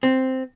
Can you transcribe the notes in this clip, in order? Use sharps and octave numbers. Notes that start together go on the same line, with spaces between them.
C4